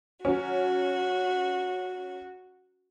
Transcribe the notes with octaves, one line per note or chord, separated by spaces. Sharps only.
F#3 C#4 F#4